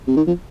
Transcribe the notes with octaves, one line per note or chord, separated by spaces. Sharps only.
C3
D#3
F3